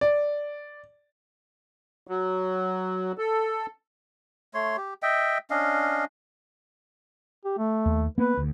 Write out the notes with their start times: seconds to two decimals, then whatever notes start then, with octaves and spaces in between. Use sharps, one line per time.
0.01 D5
2.07 F#3
3.18 A4
4.54 A3 C#5 C6
4.77 G4
5.02 D#5 E5 G5
5.50 C#4 D4 D#5 F5
7.45 G4
7.58 A3
7.86 D#2
8.18 A#3 B3 B4
8.38 D2